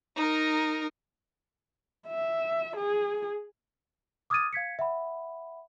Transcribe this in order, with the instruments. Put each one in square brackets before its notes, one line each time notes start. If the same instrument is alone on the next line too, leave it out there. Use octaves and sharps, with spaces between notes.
[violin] D#4 A#4
[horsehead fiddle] E5
G#4
[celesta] D6 D#6 F6 G#6 A6 D#7
F5 G#6 B6 C#7
E5 F#5 B5